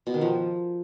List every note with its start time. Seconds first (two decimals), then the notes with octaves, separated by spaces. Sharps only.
0.07 B2
0.14 D#3
0.21 F3